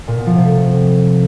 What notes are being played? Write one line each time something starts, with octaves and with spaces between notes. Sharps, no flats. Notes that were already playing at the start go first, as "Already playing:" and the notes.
A#2
B2
F3
C3
A3